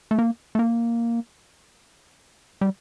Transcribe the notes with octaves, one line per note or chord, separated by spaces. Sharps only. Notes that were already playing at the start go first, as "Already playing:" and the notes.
A3
A#3
A3
A#3
G3